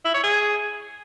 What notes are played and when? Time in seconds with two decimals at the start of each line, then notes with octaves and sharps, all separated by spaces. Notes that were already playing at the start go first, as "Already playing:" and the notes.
0.05 E4
0.14 C#5
0.23 G#4